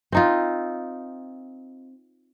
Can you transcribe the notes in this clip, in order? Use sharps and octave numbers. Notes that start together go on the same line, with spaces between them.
C4 D#4 F4